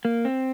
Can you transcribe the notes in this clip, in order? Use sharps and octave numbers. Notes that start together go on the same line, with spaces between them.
A#3
C4